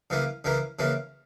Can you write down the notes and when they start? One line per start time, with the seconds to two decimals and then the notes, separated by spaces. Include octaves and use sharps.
0.10 C#3 E3 A#3
0.44 C#3 E3 A#3
0.79 C#3 E3 A#3